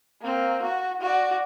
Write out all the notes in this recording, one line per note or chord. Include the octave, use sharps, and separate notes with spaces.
A#3 C4
F#4
F#4 D5